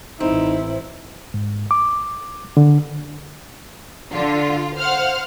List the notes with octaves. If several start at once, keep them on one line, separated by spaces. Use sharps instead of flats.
A1 C4 D#4 E4
G#2
D6
D3
D3 F4
C5 F5 F#5 F6